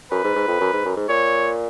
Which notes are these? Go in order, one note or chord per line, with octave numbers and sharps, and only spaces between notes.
F#2 B4
G#2
G#2
F2
F#2
G#2
F#2
G#2
A#2 C#5